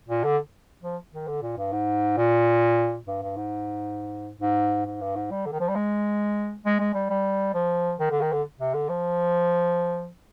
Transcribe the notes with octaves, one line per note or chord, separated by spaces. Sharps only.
A#2
D3
F3
D#3
D3
A#2
G2
G#2
A#2
G2
G2
G#2
G#2
G#2
G2
G#2
G3
D3
D#3
F3
G3
G#3
G#3
G#3
G3
G3
F3
D#3
D3
D#3
D3
C3
D3
F3